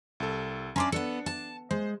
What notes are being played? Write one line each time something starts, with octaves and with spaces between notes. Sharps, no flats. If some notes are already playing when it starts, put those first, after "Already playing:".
C2 A4
C#4 D4 D5 A#5 C6 D6
B3 D4 A4 C#7
A5
G#3 C5